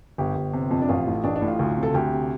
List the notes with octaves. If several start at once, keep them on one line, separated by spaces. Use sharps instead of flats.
G1 G4
G1
C3
F2
D4
A1 F4
A2
A1 D4
D4
A2
F4
D2
C3
A4
D2 G4
C3